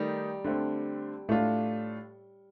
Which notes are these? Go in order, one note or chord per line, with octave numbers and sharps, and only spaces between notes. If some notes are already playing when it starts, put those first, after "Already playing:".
Already playing: D#3 G3 A3 D#4
D3 A3 C4
A2 A3 D4 F4